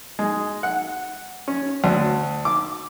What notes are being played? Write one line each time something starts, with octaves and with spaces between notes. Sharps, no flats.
G#3
F#5
C#4
D2
D6